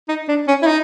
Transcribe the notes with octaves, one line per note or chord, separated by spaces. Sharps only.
D#4
D4
C#4
E4
D#4